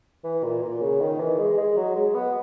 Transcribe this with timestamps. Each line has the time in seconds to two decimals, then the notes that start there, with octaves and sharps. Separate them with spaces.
0.24 E3
0.43 A#2
0.62 A#2
0.81 C#3
1.01 D#3
1.20 E3
1.38 G#3
1.57 G#3
1.76 F#3
1.95 G#3
2.15 B3